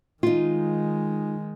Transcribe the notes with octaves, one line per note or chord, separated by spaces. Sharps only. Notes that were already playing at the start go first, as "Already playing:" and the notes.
D#3 G#3 D#4 F4